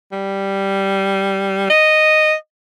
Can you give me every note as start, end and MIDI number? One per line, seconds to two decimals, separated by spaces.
0.12 1.67 55
1.70 2.35 75